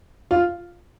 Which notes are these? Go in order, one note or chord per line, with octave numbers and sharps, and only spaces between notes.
F4